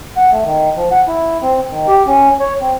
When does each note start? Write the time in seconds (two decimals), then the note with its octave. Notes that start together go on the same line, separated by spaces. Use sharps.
0.17 F#5
0.32 A3
0.45 D#3
0.77 F3
0.91 F#5
1.08 E4
1.42 C4
1.71 D#3
1.87 G4
2.07 C#4
2.40 C#5
2.61 C4